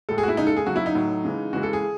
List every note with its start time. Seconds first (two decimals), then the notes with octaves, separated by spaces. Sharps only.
0.09 A2 G#3 A4
0.18 G#4
0.23 F#4
0.28 E4
0.37 C#3 G#3 D#4
0.47 A4
0.57 G#4
0.66 C#3 F#3 F#4
0.76 E4
0.86 D#4
0.95 A2 F#3
1.24 C#3 E3 G#3
1.53 C#3 E3 G#3 F#4
1.63 A4
1.73 G#4